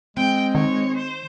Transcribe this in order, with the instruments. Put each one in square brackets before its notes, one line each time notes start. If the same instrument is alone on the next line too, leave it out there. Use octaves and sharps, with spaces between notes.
[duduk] G#3 [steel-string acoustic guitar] C4 [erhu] G5
[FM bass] D#3 [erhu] C#5
[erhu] C5